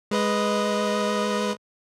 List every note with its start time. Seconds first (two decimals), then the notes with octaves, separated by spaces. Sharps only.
0.11 G#3 B4 D#5